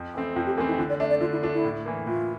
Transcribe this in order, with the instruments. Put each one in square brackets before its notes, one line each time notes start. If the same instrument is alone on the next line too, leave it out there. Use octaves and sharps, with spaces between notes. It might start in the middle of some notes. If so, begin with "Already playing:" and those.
Already playing: [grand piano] F2
E3 A3 C4
[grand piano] F2 [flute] F4
[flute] G4
[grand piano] E3 A3 C4 [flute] A#4
[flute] E4
[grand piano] D3 [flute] F4
[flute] D5
[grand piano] A3 D4 [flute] E5
[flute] D5
[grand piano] D3 [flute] F4
[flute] E4
[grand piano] A3 D4 [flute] F4
[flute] E4
[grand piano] A2
E3 A#3
[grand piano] A2 [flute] F4